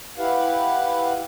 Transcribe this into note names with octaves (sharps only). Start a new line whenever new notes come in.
E4 G4 B4 F5 F#5